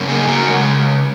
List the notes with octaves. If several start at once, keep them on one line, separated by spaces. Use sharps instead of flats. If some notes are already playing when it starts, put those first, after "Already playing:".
Already playing: F#2 C#3 A#3
D#4 G#4
F#4 A#4
C#3 G#3